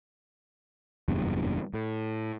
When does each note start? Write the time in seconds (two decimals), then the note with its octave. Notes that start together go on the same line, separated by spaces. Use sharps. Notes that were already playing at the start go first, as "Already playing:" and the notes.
1.08 F#1 E2 G2 A#2
1.74 A2